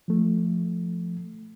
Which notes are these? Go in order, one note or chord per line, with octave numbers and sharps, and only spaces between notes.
F3 A3